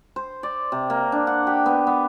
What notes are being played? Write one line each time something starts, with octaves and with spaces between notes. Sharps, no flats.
C5
D5
C3
A#3
D4
F#5
G4
B3
B3